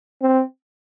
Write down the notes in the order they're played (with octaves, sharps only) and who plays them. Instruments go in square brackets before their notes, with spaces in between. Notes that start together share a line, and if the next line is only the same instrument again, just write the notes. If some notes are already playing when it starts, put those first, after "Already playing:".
[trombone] C4